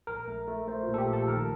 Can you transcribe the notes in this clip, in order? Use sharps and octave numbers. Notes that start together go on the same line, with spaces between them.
A#1 A#4
A3
A3
A3 C5
A#2 F4
A4
G4
A#1
A4
D#3 A#4